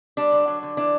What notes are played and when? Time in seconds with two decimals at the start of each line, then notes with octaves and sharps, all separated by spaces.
0.17 G3 D4
0.32 D3
0.48 F#3
0.63 D3
0.77 E3 D4